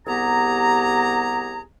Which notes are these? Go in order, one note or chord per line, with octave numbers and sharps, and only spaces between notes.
C2 B3 G4 G#4 A#5